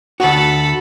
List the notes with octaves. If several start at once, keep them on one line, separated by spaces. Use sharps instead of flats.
D2 F#4 A4 B5